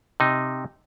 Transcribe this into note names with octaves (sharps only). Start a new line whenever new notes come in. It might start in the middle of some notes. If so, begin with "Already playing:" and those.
C3 D#4